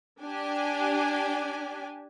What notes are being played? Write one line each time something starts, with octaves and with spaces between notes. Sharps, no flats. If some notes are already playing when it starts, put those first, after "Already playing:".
D4 G4 G#5